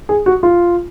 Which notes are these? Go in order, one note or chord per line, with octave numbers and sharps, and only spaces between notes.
G#4
F#4
F4